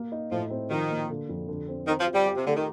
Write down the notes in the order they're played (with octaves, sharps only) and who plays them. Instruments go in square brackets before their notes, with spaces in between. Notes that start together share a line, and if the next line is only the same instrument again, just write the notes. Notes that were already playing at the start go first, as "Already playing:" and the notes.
Already playing: [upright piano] A#3
D#4
[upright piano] A2 [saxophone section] F3
[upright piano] C4
[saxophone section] D#3 [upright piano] F3
[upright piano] A#3
D3
F2
D3
C4
[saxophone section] D#3 [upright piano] C4
[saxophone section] F3
[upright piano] F4
[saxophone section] G3
[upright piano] G4
[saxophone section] C3
[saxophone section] D3 [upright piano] A3
[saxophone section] D#3